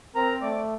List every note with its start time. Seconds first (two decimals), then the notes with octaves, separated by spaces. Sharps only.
0.15 C4 A#4 A#5
0.41 A3 D5 D6